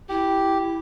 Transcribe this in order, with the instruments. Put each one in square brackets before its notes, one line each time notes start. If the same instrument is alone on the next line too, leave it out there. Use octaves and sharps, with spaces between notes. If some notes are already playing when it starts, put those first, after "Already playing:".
[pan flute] E4 [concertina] G4